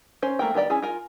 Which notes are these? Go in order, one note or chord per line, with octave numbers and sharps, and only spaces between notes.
C#4 C5
A3 A#3 A#4 G5
D#3 B3 G4 D5 G5
C#4 E4 G#4
F4 A#4 G#5